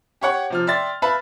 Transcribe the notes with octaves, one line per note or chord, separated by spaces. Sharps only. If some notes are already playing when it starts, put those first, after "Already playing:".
G4 C#5 F#5 C#6
C3 F3 F6
D5 E5 G5 C6 A6
B4 E5 F5 A5 B5